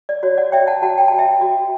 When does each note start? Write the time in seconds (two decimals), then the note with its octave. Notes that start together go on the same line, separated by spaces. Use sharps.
0.09 D5
0.23 F#4 C#5
0.38 D5 F#5
0.52 C#5 E5 G5
0.67 F#5 A5
0.82 F#4 F#5 A5
0.98 G5
1.08 F#4 A5
1.18 E5 G5
1.41 F#4